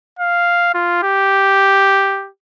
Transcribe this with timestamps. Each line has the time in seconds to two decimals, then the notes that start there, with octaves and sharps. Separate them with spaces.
0.19 F5
0.74 F4
1.03 G4